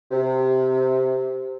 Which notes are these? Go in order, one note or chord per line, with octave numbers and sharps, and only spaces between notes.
C3